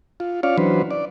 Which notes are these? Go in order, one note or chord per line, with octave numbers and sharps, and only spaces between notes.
F4
C#4 F4 C#5 D5 F5
E3 F#3 C#4 D4 B4 C5
D5